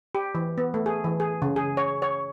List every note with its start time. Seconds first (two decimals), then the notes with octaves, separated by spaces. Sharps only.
0.15 G4
0.35 E3
0.58 B3
0.74 A3
0.86 G#4
1.04 E3
1.20 G#4
1.42 C#3
1.56 G#4
1.77 C#5
2.02 C#5